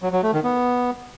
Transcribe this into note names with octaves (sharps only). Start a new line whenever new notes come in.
F#3
F#3
A3
D#3
B3